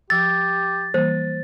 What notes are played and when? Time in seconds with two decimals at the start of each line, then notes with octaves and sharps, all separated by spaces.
0.10 F3 G4 E6 A6
0.94 E3 G3 A#3 C5